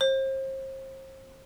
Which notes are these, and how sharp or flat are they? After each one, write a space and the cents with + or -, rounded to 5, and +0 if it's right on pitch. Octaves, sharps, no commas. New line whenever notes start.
C5 +35